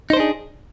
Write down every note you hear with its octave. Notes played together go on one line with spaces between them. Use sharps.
D4 D#4 G#4 C5